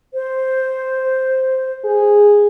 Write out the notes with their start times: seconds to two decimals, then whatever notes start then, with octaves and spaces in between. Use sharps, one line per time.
0.14 C5
1.85 G#4